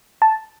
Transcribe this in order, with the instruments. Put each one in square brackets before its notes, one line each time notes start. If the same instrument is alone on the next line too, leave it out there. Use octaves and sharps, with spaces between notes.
[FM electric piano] A5